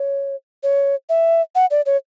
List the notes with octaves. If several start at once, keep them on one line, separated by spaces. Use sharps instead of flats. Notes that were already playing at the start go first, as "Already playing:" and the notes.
Already playing: C#5
C#5
E5
F#5
D5
C#5